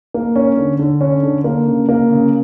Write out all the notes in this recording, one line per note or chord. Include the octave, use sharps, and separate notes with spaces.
A#3
C#4
D3
D3
C#4
D3
A#3
C#3
A#3
C#3